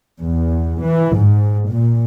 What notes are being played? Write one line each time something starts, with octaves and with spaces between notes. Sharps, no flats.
E2
E3
G#2
A#2